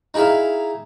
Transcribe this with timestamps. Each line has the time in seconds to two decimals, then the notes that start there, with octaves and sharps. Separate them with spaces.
0.14 D#4 E4 G#4 E5 F5